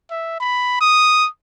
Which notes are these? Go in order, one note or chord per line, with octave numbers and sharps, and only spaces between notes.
E5
B5
D#6